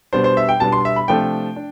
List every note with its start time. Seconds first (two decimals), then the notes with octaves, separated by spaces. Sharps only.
0.13 B2 G3 B3 D4 C5
0.24 C5
0.37 E5
0.49 G5
0.60 B2 G3 B3 D4 A5
0.72 C6
0.85 E5
0.96 B5
1.08 C3 F3 A3 D4 G5
1.56 D4